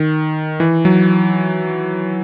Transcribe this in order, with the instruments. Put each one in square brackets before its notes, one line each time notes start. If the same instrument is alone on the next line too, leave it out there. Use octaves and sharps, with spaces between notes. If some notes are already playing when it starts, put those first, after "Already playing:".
Already playing: [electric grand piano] D#3
E3
F#3